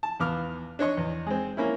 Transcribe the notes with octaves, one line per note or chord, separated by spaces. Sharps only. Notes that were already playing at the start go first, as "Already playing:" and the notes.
A5
E2 B3 F5 D6 F6
D4 C#5 D#5 C#6
E2
G#3 C4
A#3 C#4 E4